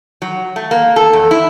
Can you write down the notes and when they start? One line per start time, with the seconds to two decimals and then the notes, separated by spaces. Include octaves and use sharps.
0.22 F#3
0.56 A3
0.71 A#3
0.96 A4
1.13 E2
1.31 E4